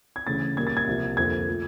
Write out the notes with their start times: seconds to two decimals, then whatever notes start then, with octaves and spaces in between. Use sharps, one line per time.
0.16 G#6
0.27 D2 C#3 E3 A3 A6
0.57 A#2 G3 A#3 G#6
0.67 A6
0.77 G#6
0.87 C2 C3 F3 A#3
1.17 F2 D3 F3 A#3 G#6
1.48 F3 A3